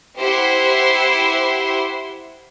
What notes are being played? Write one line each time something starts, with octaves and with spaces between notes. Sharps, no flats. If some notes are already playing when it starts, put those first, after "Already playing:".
E4 G4 C5 E5 F#5 C6